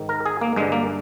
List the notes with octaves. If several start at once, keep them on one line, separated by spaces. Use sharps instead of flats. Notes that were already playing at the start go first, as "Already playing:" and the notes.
Already playing: G#2 D#3
A#4
G#4
A#3
G2 D3 G#3
A#3